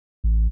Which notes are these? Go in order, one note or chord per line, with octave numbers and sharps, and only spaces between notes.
A1